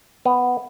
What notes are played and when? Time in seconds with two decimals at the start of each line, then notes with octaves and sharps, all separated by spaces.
0.25 B3